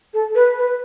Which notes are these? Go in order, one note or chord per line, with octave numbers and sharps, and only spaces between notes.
A4
B4
B4